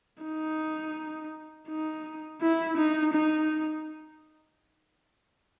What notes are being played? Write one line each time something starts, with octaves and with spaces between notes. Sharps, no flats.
D#4
D#4
E4
D#4
D#4